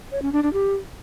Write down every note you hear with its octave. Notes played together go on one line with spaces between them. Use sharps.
C#5
C#4
D4
D4
G4